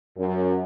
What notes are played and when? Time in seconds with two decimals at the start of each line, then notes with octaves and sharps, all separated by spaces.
0.17 F#2